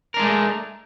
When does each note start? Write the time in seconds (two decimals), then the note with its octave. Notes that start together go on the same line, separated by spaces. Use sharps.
0.14 A#4
0.17 D4
0.19 G#3
0.22 A3